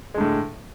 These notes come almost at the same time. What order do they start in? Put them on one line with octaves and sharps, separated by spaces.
G#3 D3 A2